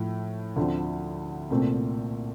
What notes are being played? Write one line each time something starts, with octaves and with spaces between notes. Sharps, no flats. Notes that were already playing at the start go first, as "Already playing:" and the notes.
Already playing: A2 F3 A3
D2 D3 F3 C4
C2 A#2 A3 C4